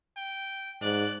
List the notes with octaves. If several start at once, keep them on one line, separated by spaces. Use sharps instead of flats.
G5
G#2 D5 F#6